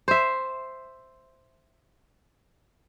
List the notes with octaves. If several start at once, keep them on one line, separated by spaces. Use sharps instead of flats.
C5 E5